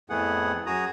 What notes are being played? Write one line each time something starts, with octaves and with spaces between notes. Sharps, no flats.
F2 A2 A3 B3 G#4 F#5
F#2 F#4 G#4 A#5 D#6